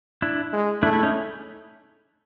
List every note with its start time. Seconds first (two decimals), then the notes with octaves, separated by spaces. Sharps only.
0.22 D4 E4
0.53 G#3
0.82 A3 D4 E4
0.93 E4
1.03 C#4 D#4